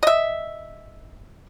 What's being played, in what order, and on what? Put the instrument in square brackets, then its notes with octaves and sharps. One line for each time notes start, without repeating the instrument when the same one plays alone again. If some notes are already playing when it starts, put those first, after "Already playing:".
[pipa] D#5 E5